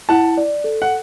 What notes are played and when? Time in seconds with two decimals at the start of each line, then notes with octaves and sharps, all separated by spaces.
0.09 E4 F#5 A5
0.37 D5
0.64 A4
0.82 F#5